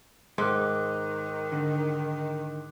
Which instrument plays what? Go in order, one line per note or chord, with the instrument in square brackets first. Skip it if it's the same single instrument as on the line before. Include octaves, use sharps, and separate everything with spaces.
[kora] G#2 [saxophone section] D#3 [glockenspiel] C6 D6 F#6
[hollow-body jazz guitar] D3